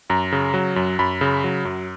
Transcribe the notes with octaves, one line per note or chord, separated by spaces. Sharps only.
F#2 A#5
C#3
F#3
F#2
F#2 B5
C#3
F#3
F#2